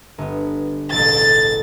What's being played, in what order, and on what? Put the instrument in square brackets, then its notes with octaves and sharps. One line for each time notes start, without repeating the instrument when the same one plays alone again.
[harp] G1 B3
[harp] E1 A1 [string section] A6